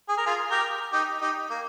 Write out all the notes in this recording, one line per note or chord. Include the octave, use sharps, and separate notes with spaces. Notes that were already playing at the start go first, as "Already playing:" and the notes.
G#4
A#4
F4 G#4
G4 A#4
D#4 G4
D#4 G4
A#3